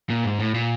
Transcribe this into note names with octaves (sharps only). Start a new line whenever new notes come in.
A#2
G#2
A2
A#2